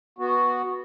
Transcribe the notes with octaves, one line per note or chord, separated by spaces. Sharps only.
B3 F#4